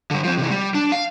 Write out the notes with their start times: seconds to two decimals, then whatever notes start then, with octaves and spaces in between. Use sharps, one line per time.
0.11 D3 G3
0.24 F3 C4
0.37 C3 E3
0.51 G3
0.74 D4
0.92 F5